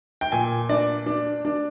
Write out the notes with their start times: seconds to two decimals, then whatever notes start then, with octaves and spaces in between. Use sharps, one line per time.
0.21 G5
0.32 A#2 G#5
0.69 D4 D5
1.06 D4
1.45 D4